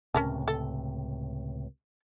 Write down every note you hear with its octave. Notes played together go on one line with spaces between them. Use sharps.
C#2 A2 C3 C#4 A#4 A5
A4